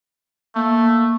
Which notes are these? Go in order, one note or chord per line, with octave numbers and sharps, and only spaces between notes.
A3 A#3